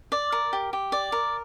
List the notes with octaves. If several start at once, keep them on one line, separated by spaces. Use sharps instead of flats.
D5
A#4
G4
G4
D5
A#4